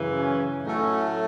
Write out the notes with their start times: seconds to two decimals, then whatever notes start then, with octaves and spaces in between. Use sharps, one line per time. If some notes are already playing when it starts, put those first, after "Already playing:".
Already playing: F#2 C#3 E3
0.17 C#4
0.63 A2 F#3 A3 C#4 D#4